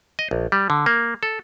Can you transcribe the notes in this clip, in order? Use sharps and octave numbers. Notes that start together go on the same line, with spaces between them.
D#5
A#1
G3
D3
A#3
A4